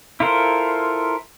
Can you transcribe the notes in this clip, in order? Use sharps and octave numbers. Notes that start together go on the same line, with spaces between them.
E4 F4 A4 A#4 C5